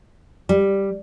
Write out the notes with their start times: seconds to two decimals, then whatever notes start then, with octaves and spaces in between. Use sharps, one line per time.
0.49 G3